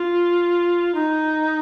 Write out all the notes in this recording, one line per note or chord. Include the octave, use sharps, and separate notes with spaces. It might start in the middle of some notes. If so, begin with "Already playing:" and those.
Already playing: F4
D#4